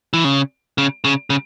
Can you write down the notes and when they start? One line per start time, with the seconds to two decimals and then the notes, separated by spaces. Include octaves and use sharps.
0.13 E3
0.24 C#3
0.78 C#3
1.04 C#3
1.30 C#3